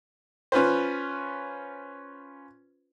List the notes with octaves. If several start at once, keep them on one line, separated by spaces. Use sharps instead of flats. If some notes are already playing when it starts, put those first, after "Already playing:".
C#4 F4 B4 C5